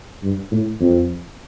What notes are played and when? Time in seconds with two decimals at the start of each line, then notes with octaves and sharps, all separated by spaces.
0.23 G2
0.51 A2
0.80 F2